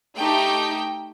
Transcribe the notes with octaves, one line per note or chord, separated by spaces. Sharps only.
A3 D#4 G4 G5